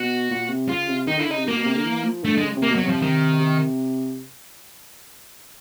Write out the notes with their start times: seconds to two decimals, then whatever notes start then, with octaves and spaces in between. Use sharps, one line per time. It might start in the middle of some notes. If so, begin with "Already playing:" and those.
Already playing: B2 F#4
0.31 A#2
0.49 C3
0.69 C#3 F4
0.88 C3
1.08 D#3 D#4
1.18 D3 E4
1.28 C#3 D#4
1.37 C3
1.46 B2 A#3
1.56 B2
1.66 C3
1.75 D3
1.85 E3
2.04 F3
2.24 D3 A3
2.38 G#3
2.43 C#3
2.56 C3
2.63 A#3
2.69 B2
2.75 F#3
2.83 C3
2.89 F3
3.02 D#3
3.40 C3